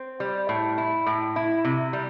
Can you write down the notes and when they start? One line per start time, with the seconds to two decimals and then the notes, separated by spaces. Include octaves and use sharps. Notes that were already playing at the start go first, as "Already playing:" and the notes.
Already playing: C4
0.20 G3
0.49 A2
0.78 E4
1.06 A2
1.36 E4
1.65 C3
1.93 G3